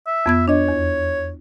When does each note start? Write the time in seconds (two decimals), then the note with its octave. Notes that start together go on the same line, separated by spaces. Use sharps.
0.07 E5
0.26 F2 B3 G#6
0.48 D4 C#5 D#5
0.68 E2